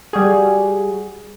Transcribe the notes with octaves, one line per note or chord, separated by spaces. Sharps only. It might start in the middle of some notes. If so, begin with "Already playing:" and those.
G3 F#4 G#4